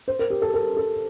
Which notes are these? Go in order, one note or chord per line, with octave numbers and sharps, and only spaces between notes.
C5
A#4
G4
A4
A#4
A4